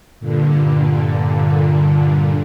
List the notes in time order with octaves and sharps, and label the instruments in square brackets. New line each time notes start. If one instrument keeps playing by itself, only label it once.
[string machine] G2 A#2 D3